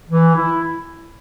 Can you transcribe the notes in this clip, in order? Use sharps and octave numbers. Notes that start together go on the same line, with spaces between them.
E3
E4